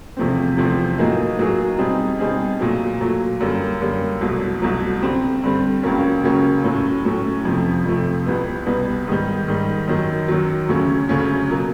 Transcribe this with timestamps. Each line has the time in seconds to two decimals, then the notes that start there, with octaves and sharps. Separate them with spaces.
0.17 E2 C3 F3 A3 C4
0.57 E2 C3 F3 A3 C4
0.98 A2 F#3 A#3 D#4 G#4
1.39 A2 F#3 A#3 D#4 G#4
1.78 B2 G3 C4 D#4 G#4
2.19 B2 G3 C4 D#4 G#4
2.60 A#2 F#3 A3
3.01 A#2 F#3 A3
3.41 F#2 D3 G3 A#3
3.81 F#2 D3 G3 A#3
4.21 C2 B2 F#3 A3
4.62 C2 B2 F#3 A3
5.02 G2 D3 G3 C4
5.43 G2 D3 G3 C4
5.83 C#2 C#3 F#3 A#3 C#4
6.23 C#2 C#3 F#3 A#3 C#4
6.64 A2 F#3 A3 C#4
7.05 A2 F#3 A3 C#4
7.45 F2 C3 F3 A3
7.86 F2 C3 F3 A3
8.26 C2 B2 G3 B3
8.66 C2 B2 G3 B3
9.07 G#2 D#3 G3
9.48 G#2 D#3 G3
9.88 F#2 D#3 F#3
10.28 F#2 D#3 F#3
10.69 D2 C#3 F#3 A3 C#4
11.09 D2 C#3 F#3 A3 C#4
11.49 B2 F#3 A#3